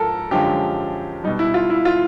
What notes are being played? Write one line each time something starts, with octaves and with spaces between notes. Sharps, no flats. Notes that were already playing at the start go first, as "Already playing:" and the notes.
Already playing: G#2 F3 A4 A#4
F#2 D3 F3 G#3 G4
B2 G3 D#4
E4
F4
E4
F4